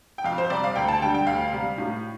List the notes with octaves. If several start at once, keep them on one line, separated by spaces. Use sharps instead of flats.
G5
F2 F5
C5
C3 G3 D5
F5
D2 G5
A5
D3 G3 G5
G5
D2 F5
C3 G3
A2